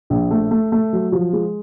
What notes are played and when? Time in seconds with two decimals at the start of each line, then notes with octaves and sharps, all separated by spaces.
0.10 A#1
0.31 A3
0.51 A3
0.72 A3
0.93 F#3
1.12 F3
1.33 G#3